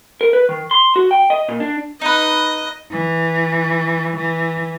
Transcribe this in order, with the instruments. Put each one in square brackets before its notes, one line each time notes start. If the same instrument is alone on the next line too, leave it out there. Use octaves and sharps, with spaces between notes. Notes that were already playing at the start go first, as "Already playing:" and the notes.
[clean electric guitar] A#4
B4
D#3
C6
F#4
G5
D#5
A#2
D4
[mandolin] D#4 B4 [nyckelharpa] D#5
[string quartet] E3
E3